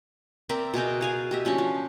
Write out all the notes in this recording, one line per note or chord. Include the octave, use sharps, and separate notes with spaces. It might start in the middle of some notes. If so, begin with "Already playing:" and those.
C4 A#4 D5 E5
B2 G#4 A#4 G5
G#4 F5 G#5
G4 D#5 E5
F3 C#4 D4 F#4
F3